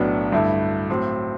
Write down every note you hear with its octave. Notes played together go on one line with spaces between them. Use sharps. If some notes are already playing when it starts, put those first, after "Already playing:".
Already playing: B1 A2 F#3 B3 D4
G2 D3 A3 E4
A2 F#3 C4